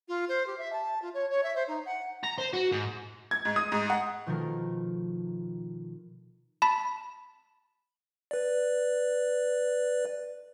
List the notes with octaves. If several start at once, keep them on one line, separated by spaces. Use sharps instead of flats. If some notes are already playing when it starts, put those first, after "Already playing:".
F4
C5
G4
E5
A5
F4
C#5
C#5
E5
C5
D#4
F#5
A#5
C5
F#4
G#2
G#6
G#2
D#6
G#2
F#5
B2 D#3 F3 A3 A4 A#4
A5 B5
B4 D5